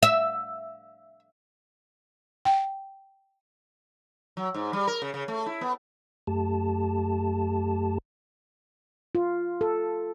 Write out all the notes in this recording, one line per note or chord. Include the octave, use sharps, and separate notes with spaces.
E5
G5
F#3
G#2
G3
A#4
C#3
C#3
A3
E4
B3
F#2 A3 G4 A5
F4
A4